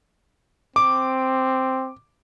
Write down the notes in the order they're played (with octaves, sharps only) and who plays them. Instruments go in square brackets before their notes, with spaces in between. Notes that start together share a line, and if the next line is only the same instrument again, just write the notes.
[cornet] C4 [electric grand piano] D6